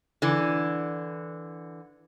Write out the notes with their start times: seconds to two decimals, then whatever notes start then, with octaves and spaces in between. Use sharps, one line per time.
0.22 D3 E3